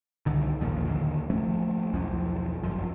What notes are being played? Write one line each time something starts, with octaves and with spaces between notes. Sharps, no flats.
C2 D3 D#3
A1 D#2 A#2 F3
D1 G#1 D#2 D3
F3 A3 C#4
B1 E2 E3 F3
G1 F#2 F3